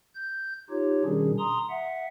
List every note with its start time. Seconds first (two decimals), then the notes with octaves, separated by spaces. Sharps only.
0.15 G6
0.70 D#4 F4 G4 C#5
1.05 B2 D#3 G3 C#4 D4 G#4
1.39 A#5 C6 D#6
1.70 E5 F#5